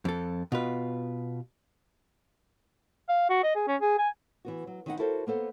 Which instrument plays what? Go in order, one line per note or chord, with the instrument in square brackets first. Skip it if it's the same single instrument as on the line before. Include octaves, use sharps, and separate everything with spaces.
[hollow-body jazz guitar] F2 A4
B2 F4 B4
[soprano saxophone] F5
F#4
D#5
G#4
C#4
G#4
G#5
[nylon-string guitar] E3 B3 F#4
F#3
D#3 E3 B3 D#4 A4 F#5
E4 F#4 A4 A#4 C5
A#3 B3 A4 C5